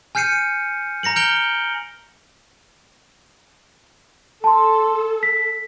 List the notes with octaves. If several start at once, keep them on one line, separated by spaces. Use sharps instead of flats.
G#5 F6 G6 C7 C#7 D#7
A#5 A#6 C#7 F#7
F6 G6 C#7 D7 F7 G7
A4 A5 C6
B6